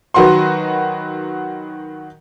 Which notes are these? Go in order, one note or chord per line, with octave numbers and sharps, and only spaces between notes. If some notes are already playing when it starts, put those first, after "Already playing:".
D#3 F#3 F#4 B4 C6